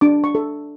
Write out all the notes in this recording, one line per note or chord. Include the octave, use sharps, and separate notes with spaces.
D4 D6
C#6
A4